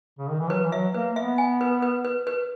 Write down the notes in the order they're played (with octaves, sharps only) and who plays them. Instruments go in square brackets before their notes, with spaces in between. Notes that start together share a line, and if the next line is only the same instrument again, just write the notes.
[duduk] C#3
D#3
E3
[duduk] F#3 [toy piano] B4
[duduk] E3
[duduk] F#3 [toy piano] E5
[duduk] A#3 [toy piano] B4
[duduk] B3 [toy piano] E5
[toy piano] G#5
B4
B4
B4
B4